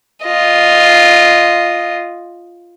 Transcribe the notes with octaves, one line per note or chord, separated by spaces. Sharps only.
F4 D#5